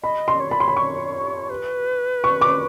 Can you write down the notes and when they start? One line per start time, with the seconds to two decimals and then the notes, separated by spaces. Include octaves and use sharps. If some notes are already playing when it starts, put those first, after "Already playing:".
0.03 D#5 B5
0.28 C6
0.40 C#5
0.50 D5 B5
0.60 C#5 C6
0.68 B5
0.77 C#6
1.50 B4
2.24 C#6
2.41 D6